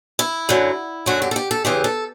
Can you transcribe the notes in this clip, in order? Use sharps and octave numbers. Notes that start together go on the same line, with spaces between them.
E4
F#2 D3 F#3
F#2 D3 F#3 F#4
G4
A4
G4
A4
E2 C#3 E3 G4
A4